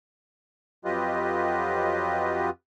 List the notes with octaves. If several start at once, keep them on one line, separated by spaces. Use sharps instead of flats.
F2 F#3 F4 G4 B4 D#5